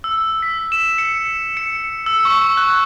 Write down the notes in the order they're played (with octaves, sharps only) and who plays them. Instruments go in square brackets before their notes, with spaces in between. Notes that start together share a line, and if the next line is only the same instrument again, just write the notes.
[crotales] E6
B6
E7
C#7
C#7
E6
C#6
F#6